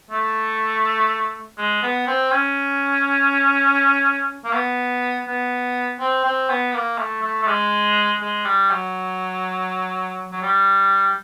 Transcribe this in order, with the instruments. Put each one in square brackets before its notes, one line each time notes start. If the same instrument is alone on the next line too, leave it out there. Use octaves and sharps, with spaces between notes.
[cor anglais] A3
G#3
B3
C4
C#4
A#3
B3
B3
C4
C4
B3
A#3
A3
A3
A3
G#3
G#3
G3
F#3
F#3
G3